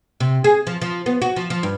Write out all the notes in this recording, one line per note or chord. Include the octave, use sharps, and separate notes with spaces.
C3
G#4
F3
F3
B3
F#4
F3
F3
G2